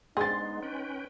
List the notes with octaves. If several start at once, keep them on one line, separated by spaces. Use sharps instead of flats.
G#3 B3 C4 D4 D#4 G#4 C6 A6
C#4 B4 G5